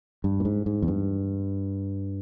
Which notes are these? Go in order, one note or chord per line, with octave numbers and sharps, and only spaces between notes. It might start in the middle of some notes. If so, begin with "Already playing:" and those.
G2
A#2
G#2
G#2
E2
G2